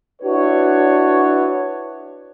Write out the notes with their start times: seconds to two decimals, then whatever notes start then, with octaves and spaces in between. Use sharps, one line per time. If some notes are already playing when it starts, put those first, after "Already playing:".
0.22 D4 E4 F#4 B4 C#5